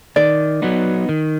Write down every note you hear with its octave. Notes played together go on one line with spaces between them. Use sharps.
D#3 D5
F#3 B3 D#4
D#3